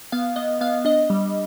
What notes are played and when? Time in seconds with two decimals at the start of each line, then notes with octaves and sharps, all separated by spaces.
0.12 B3 F5
0.36 B3 D#5
0.61 B3 F5
0.85 D4 D#5
1.10 G3